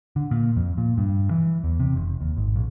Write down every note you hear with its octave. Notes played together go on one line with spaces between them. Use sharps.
D3
A#2
F2
A#2
G2
E3
E2
C3
F1
D#2
G#1
A#1